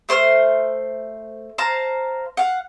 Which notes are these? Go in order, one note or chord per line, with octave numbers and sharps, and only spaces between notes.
A3 C5 C6 F6
C5 F5 A5 A#5
F5 F#5